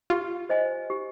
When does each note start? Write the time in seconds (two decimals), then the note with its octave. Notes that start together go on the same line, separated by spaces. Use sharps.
0.10 F4 G4
0.49 C5 D#5 G#5
0.90 G4